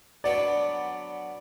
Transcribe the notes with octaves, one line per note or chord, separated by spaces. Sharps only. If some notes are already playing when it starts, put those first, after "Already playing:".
F#3 B3 D4 D5